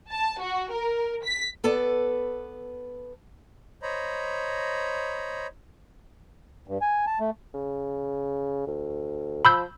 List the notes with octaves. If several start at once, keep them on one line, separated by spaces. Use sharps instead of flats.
A5
F#4
A#4
B6
B3 A4 B4 D5
C5 C#5 D#5 A#5 B5
G2
G#5
A5
A3
C#3
D2
F3 B5 E6 G6